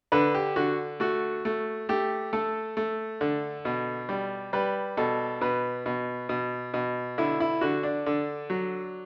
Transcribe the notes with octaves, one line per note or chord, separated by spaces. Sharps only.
D3 B4
G4
D3 F#4
A3 F#4
A3
A3 G4
A3 A4
A3
D3
B2
G3
G3 B4
B2 A4
B2 B4
B2
B2
B2
D3 E4
E4
D3 F#4
D4
D3
F#3